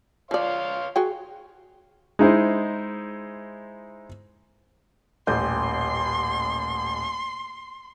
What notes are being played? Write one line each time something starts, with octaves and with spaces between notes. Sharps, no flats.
F3 C#5 D5 F5 C6
F#4 G#4 G5
G#3 D#4 E4 C5
D#1 A1 C6 G6